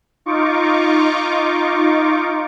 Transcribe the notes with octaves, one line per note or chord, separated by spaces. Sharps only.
D#4 F4 C#6 D6